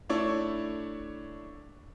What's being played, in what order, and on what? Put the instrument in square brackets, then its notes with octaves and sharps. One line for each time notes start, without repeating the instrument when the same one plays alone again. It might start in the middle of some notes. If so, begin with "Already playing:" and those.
[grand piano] A3 D4 E4 C#5